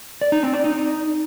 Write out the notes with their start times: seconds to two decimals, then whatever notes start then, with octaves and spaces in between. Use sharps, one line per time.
0.21 D5
0.32 D#4
0.43 C4
0.53 D5
0.64 D#4